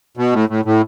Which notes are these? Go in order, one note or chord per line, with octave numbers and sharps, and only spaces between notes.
B2
A2
A2
A2